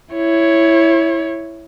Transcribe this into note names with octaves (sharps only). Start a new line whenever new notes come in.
E4 C#5